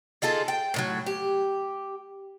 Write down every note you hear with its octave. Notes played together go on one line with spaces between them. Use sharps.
D#4 F4 G#4 A4
G5
A2 D#3 F#3
G4